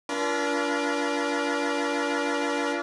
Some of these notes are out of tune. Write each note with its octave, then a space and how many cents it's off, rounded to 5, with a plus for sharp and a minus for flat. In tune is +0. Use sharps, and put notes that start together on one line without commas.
D4 -35 F4 -40 A#4 +40